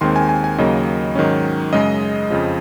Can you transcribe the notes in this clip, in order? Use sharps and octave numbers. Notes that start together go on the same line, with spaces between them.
D#2 D#3 G#3 C4 C6
G#5
G#5
G#5
D#2 C#3 F#3 A#3 D#5
G#2 D#3 F#3 C#4
F#2 C#3 G#3 D#5
F2 C#3 F3